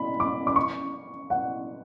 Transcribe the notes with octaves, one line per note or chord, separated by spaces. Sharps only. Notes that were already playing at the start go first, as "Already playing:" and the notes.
Already playing: B5
D6
D6
C#6
F#5